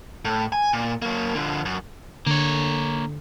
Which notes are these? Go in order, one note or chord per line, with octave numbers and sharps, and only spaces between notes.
A2
G#5
A#2
F#3 A#3
D3 F3
F#2
D3 A#3 C#5